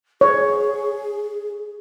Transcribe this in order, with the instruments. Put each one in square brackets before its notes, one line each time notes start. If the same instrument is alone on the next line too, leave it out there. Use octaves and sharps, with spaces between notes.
[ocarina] G#4 [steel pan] C#5